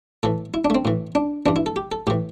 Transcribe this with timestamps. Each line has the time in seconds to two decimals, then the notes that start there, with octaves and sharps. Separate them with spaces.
0.23 A2 E3 A4
0.54 E4
0.65 D4
0.70 A3
0.75 C4
0.85 A2 E3
1.15 D4
1.46 G2 E3 D4
1.56 E4
1.66 A4
1.76 G4
1.92 A4
2.07 A2 G4
2.10 E3